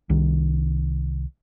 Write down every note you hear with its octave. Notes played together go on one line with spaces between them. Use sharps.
C2 D#3